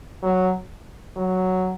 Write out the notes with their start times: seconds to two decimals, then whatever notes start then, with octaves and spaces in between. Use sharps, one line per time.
0.23 F#3
1.16 F#3